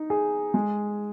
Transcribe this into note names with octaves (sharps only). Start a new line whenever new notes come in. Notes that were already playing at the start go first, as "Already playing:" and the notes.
Already playing: D#4
G#4
G#3